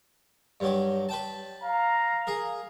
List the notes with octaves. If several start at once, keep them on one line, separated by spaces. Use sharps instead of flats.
G2 F#3 G4
B4 G5 A5
F5 A#5
G#4 A#4